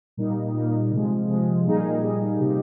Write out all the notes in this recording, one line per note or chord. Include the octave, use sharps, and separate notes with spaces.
A#2 G3 A#3 D#4
A#2 G3 A#3 D#4
C3 F3 G#3
C3 F3 G#3
A#2 G3 A#3 D#4 G#4
A#2 G3 A#3 D#4 G#4
C3 F3 A#3 D#4 G4